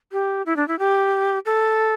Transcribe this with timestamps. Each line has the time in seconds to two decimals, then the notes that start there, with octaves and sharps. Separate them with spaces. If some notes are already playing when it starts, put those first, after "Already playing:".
0.12 G4
0.46 E4
0.56 D4
0.68 E4
0.79 G4
1.46 A4